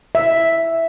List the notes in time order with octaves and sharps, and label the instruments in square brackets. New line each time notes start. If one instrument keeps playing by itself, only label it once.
[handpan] E5